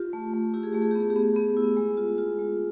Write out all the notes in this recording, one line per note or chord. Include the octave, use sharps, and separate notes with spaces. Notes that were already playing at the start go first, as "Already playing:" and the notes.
Already playing: F4 G4
A3
A3
E4 G4
G#4
A3 G4
G#4
B3 G4
G#4
G4
B3
B3 G#4
E4
G#3
F4
F4
G#3